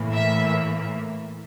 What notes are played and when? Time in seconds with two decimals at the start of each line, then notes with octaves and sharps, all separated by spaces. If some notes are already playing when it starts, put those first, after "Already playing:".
Already playing: A2 E3 A#3
0.13 E5